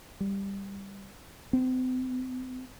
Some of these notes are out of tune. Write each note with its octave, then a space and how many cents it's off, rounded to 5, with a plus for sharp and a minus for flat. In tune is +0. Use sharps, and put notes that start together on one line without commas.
G3 +10
C4 -40